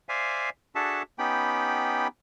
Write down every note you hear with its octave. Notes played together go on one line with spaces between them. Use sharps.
C5 D5 E5 F5 G#5
D4 F#4 G#4 A4 E5 A5
B3 C#4 D#4 G4 G5 B5